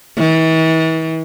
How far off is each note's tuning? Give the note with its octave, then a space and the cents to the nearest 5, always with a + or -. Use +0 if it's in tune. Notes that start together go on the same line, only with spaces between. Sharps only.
E3 -40